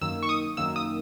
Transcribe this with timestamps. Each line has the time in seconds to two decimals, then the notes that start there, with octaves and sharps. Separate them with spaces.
0.01 F#2 D#3 A#3 E6
0.23 C#6
0.29 D#6
0.57 F#2 D#3 A#3 E6
0.76 D#6